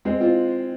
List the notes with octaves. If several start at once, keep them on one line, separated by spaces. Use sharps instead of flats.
G#3 C4
C4 F4